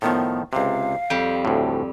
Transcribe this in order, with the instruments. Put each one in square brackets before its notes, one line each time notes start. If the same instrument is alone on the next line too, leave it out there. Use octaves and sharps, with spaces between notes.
[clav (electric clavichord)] A2 D#3 F3 [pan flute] B3
[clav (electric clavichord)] C#2 C3 [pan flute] F5
[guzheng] F2 G3 [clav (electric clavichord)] G5
[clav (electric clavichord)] D2 A2